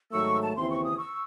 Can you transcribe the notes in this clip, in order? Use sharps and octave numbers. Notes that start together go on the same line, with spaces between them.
G#2 D#3 F#3 A3 C#6 E6
A5
D#2 C#3 E3 C4 E4 C6
C#6
D#6
C#6 E6